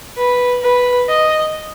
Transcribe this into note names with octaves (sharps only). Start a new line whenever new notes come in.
B4
B4
D#5